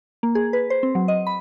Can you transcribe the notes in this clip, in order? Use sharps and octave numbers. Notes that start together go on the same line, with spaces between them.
A#3
G#4
B4
C5
C4
F#3
D#5
B5